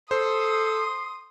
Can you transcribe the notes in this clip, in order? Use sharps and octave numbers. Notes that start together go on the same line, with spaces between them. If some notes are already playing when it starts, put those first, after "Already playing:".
A4 C5 C6 D#6